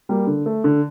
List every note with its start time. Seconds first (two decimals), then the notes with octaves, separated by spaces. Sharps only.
0.09 G3 A#3
0.27 D3
0.46 A3
0.64 D3